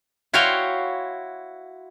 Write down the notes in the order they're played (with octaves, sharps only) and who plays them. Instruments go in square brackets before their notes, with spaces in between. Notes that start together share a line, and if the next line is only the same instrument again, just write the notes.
[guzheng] E4 F#4 C#5 F5 G5 C6